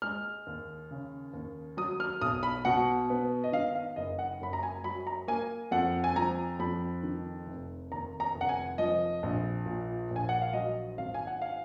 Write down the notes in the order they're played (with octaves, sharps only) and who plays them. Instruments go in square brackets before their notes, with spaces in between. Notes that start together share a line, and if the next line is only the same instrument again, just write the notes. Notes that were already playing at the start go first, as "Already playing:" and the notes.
[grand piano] G#3 F6
D#2
C#3
D#2
F#3 D#6
F6
B1 D#6
B5
B2 F#5
B3
D#5
D#3 F5
F5
F#1 D#5
F#5
F#2 B5
A#5
G#5
F#3 B5
A#5
A#3 G#5
F2 F#5
G#5
F3 A#5
F2 B5
D#3
F1
D#2 A#5
A#5
F1
F#5
G#5
F3 D#5
A#1
A#2
A#1
G#5
F#5
F5
F#3 D#5
G#1 F5
G#5
F#5
F5